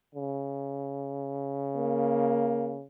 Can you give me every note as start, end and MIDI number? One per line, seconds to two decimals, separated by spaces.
0.15 2.85 49
1.76 2.76 58